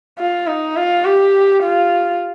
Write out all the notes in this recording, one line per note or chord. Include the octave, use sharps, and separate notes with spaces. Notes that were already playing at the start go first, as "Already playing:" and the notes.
F4
D#4
F4
G4
F4